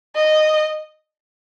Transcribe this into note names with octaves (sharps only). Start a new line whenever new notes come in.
D#5